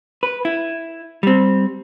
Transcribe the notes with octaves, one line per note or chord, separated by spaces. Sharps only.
B4
E4
G3 C4